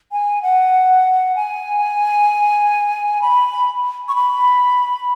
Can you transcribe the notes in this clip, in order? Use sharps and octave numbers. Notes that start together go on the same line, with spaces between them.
G#5
F#5
G#5
B5
C#6
B5